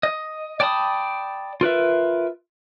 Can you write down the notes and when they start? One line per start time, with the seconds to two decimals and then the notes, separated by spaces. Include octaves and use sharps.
0.03 D#5
0.60 D5 G5 A5 B5 D#6
1.61 F4 A#4 B4 E5